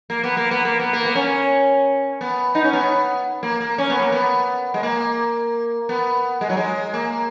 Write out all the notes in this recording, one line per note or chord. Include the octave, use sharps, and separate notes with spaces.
A#3
B3
A#3
B3
A#3
B3
A#3
B3
C#4
B3
D#4
C#4
B3
A#3
A#3
C#4
B3
A#3
B3
G#3
A#3
B3
G#3
F#3
G#3
A#3